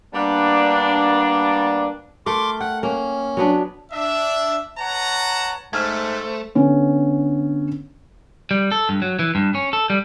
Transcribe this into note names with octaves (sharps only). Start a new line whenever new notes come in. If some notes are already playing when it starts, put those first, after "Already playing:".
G3 A#3 B3 D4
A3 A#4 C6 D6
F#5 G5
A#3 C#4
F#3 B3 D4
D4 E5
B4 C#5 F#5 A5 A#5
G#2 A3 C5 F6 G#6
D3 B3 C#4
G3
A4
G2
F#3
E3
G2
C#4
A4
G3